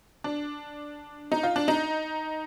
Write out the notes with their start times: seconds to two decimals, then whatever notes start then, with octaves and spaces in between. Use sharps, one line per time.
0.24 D4
1.32 D#4
1.43 F4
1.56 D4
1.68 D#4